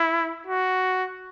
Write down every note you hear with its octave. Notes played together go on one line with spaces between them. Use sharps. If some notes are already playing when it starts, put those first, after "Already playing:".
Already playing: E4
F#4